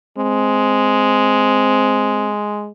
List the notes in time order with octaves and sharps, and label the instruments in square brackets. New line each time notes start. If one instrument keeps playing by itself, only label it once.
[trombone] G#3 [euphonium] C4